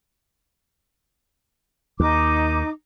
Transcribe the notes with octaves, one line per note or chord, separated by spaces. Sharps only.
D#2 D#4 D6